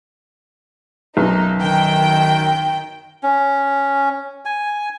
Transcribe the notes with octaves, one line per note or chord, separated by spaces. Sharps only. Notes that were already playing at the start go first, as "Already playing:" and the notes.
B1 F#2 D#4
D#3 G5
C#4
G#5